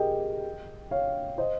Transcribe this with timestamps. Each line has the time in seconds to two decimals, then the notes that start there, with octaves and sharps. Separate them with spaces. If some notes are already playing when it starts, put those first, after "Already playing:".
Already playing: G4 G#4 A#4 D#5 G5
0.91 C#5 F5
1.38 C5 D#5